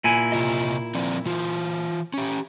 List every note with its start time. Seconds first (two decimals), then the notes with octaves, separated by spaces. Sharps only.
0.04 A#2 E4 G#5
0.32 C3 F4 D#5
0.95 F3 C4 D5
1.26 E3 F4
2.14 C#4 G4